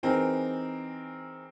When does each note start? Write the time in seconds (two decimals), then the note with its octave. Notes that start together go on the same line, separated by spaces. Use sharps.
0.03 E3 C4 D#4 G#4 A#4